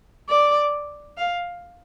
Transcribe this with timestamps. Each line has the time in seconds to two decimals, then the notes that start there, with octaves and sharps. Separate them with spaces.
0.29 D5
1.17 F5